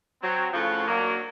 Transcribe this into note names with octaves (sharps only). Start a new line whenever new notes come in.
F#3 C4
A2 C#3 F3 F4 F#4 F#5
F#3 A#3 D4